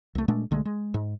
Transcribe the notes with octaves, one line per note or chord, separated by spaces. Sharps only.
C2 A3
A#2 G#3 A3 D4
B1 D3 G#3 A3
G#3
G#2